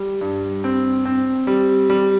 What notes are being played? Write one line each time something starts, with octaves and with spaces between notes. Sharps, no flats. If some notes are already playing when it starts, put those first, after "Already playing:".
Already playing: G3
G2
C4
C4
G3
G3